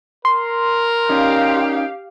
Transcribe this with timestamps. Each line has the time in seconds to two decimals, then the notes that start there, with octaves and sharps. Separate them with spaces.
0.25 A#4 C6
1.09 C#4 D#4 G4 F5